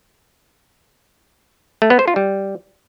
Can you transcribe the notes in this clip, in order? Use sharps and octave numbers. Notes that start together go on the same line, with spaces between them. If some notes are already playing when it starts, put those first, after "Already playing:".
A3
B3
C5
F4
G3